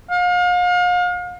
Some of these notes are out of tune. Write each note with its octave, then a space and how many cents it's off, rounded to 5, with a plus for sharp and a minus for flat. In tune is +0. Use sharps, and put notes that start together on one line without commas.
F5 +35